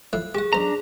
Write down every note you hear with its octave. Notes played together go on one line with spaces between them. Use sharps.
A2 F3 E4 F#6
G4 G#4 F#5
B1 D4 C5 A#5